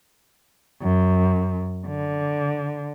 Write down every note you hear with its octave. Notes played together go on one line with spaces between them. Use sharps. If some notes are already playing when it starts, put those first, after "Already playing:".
F#2
D3